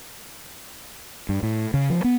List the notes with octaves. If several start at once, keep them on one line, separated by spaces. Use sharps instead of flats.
G2
A2
C#3
F3
B3